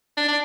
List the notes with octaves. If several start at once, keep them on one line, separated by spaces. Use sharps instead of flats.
D4
D4